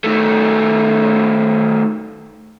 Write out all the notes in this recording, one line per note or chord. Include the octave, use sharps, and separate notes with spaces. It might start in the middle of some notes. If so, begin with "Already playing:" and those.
D#3 A3